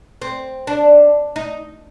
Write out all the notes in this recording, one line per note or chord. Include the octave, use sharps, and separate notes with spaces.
C4
D4
D#4